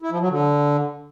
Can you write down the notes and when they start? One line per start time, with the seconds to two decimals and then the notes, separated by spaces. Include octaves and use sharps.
0.02 E4
0.12 F3
0.21 F#3
0.30 D3